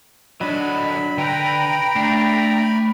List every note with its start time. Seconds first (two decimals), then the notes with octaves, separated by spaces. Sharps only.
0.41 D3 F#3 D4 D#5 B5
1.18 D3 B4 G5 A#5
1.96 A3 D4